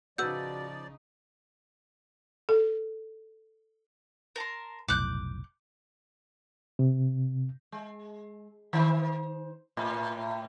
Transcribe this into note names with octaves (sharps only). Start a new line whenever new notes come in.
C#3 F3 D#4 F#4 B4 D5 E6 G6
A4
A#4 A5 C6
F1 B1 A2 D6 F#6 G6
C3
G#3
D#3 C5
A2